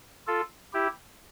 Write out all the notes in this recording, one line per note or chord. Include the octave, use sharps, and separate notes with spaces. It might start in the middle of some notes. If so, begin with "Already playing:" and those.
F4 A4
E4 G4